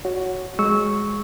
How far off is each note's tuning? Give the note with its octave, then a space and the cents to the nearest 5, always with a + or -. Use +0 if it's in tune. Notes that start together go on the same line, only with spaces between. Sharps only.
F#4 +0 C#5 +0
G#3 +0 C#6 +0 E6 -20